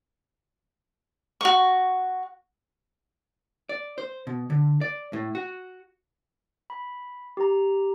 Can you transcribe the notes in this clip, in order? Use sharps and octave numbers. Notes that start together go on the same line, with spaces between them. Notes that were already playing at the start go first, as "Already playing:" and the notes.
F#4 C#6
D5
C5
B2
D3
D5
A2
F#4
B5
G4 A#5